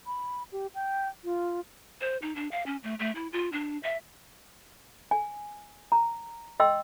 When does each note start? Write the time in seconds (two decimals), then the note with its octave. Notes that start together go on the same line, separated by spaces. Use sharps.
0.06 B5
0.52 G4
0.75 G5
1.24 F4
2.01 C5
2.22 D#4
2.36 D4
2.51 F5
2.66 C#4
2.83 A3
2.99 A3
3.15 E4
3.33 F4
3.52 D4
3.83 E5
5.11 G#5
5.92 A#5
6.60 D#5 G5 C6 E6